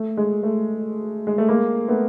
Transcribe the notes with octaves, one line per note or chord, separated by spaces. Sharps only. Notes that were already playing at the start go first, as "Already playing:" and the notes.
Already playing: A3
G#3
A3
G#3
A3
G#3 A#3
A3 B3